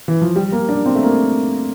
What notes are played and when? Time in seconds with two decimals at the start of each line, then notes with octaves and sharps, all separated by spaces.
0.08 E3
0.22 F3
0.36 G3
0.52 A#3
0.69 D4
0.86 C4
0.95 A3
1.03 A#3